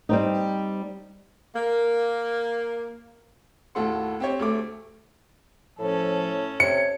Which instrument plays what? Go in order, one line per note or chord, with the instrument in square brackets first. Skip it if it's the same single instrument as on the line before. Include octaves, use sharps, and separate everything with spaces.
[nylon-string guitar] G3 C4 D#4
[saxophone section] A#3
[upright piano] D#2 A2 F#4 A4 F#5 C6
C4 G4 C#5
D2 A3 D6
[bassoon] A2 [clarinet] F3 [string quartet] C#4 A4
[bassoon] C3 [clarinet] C#5 [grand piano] C#7